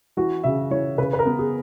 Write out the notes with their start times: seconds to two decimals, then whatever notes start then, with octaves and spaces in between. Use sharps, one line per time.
0.17 E3 F#4
0.44 C#3 E5
0.71 E3 C#5
0.98 C#3 B4
1.13 B4
1.19 A#4
1.25 B3
1.39 G#4